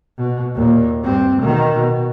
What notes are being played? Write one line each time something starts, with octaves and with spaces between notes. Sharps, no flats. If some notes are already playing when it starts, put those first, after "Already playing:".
B2
D#2 A#2
G2 C4
B2 D#3
B2